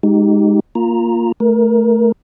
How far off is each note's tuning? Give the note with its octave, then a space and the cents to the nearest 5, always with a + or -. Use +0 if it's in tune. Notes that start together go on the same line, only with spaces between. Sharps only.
G#3 +0 D#4 +0 G4 -25
A#3 -5 F4 +0 A#5 +0
A3 +0 A#4 +15